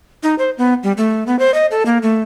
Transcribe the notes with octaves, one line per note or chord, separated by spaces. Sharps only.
D#4
C5
B3
G3
A3
B3
C5
D#5
A4
A#3
A3